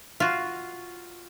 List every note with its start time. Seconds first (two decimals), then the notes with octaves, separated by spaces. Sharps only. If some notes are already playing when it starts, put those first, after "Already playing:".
0.20 F4 F#4